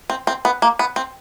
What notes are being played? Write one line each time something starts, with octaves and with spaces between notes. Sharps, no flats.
C4
C4
B3
A#3
B3
C4